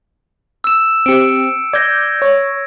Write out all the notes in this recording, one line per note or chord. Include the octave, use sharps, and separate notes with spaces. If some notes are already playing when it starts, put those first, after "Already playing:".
E6 E7
C4 G4 C#7 D7
D5 G6 G#6 A#6
C#5